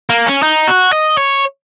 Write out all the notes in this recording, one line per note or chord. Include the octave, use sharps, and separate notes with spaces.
A#3
C#4
D#4
F#4
D#5
C#5